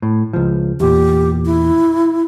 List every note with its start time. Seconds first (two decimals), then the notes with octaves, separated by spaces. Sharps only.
0.02 A2
0.33 C#2 F3
0.80 E2 A#2 G4
1.45 E4